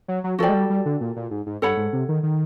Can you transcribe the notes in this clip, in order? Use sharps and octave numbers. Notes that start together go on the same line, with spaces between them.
F#3
F#3
F3 F#4 A4 D5 G5
G#3
G3
G3
D3
A#2
A#2
G#2
G#2
G2 A4 C#5 F#5 B5
G#2
C3
D#3
D#3